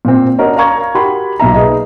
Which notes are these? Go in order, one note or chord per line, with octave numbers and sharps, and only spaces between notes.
A#2 C4
C#4 D4 F#4 A#4 D#5
A#4 F5 A#5 C#6 G#6
F#4 G4 A#4 B5 C6
B1 A#2 E5 A#5
D#4 G#4 B4